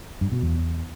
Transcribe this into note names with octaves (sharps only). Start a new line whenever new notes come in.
G2
B2
E2